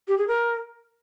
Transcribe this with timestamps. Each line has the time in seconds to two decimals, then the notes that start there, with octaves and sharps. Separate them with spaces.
0.07 G4
0.17 G#4
0.27 A#4